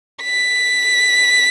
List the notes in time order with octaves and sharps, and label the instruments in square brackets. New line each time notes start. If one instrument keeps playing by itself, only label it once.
[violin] B6